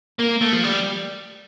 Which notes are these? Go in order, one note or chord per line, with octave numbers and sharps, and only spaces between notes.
A#3
A3
F3
G3